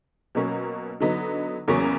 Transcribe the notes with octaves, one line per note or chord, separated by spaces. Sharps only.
B2 F#3 A#3 C#4
D3 F#3 B3 D#4
E2 C#3 F#3 A#3 C#4